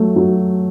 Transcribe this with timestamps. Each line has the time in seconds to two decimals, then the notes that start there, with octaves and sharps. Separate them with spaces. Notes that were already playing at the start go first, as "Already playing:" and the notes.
Already playing: F#3 A3
0.16 F#3